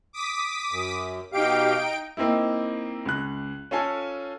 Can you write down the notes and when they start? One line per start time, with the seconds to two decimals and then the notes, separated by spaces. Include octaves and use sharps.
0.13 D6 D#6 B6
0.71 F#2
1.32 B2 D#4 G4 F5 G5 D7
2.17 A#3 C4 D#4 E4
3.06 C#2 F#6
3.71 C#4 F4 A4 G#5